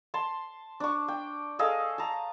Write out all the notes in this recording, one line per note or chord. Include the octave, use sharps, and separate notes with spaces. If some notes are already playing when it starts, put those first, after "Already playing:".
A5 C6
D4 C#6
G5
G#4 A4 D#5 F5
A5 A#5